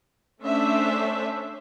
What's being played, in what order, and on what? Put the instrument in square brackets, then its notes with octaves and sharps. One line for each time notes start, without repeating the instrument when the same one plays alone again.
[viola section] A3 C#4 D4 C5 E5